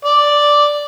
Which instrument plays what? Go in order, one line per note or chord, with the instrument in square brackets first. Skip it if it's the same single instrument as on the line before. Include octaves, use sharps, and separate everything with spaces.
[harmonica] D5